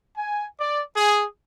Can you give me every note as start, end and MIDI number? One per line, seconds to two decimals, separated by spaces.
0.17 0.46 80
0.60 0.82 74
0.95 1.25 68